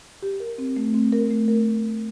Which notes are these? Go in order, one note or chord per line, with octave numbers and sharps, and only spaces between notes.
G4
A#4
C4
A3
C4
A#4
A3
A#4